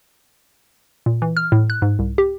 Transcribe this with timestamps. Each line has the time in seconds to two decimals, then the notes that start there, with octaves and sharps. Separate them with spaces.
1.06 A#2
1.22 E3
1.37 F6
1.52 A2
1.70 F#6
1.82 G#2
1.99 C2
2.18 G4